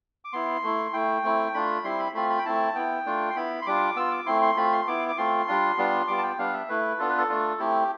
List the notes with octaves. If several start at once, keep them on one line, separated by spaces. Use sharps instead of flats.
D6
B3 E4 C6
A3 E4
A3 E4 G5
A3 C4 E4
A3 D4 F4 B5
G3 C4 E4 C6
B5
A3 C4 F4 B5
B5
G5
A3 C4 E4 A5
B3 E4 G5
A3 D4 F4
C6
B3 E4 B5
C6
G3 D4 F4 D6
B3 F4 E6
D6
A3 C4 E4 C6
C6
A3 C4 F4 B5
C6
B3 E4 D6
D6
A3 C4 F4 C6
G3 D4 F4
G3 B3 D4 F4
G3 B3 F4 D6
A5
G5
G3 B3 D4 F5
E5
A3 E4 B4
B3 D4 F4 A4
B4
A4
A3 D4 F4
A3 C4 E4 G4